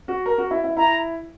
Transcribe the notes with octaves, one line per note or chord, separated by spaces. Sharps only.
F#4
A#4
F#4
E4
E4
E4 A#5